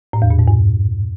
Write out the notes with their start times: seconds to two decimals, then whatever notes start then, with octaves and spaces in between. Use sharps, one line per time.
0.13 A2
0.22 E2
0.30 A#2
0.39 G#2
0.48 G2